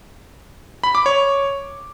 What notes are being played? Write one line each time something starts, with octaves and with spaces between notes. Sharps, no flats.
B5
D6
C#5